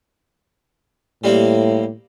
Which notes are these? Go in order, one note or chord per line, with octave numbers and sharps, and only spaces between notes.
A2 G3 A#3 C4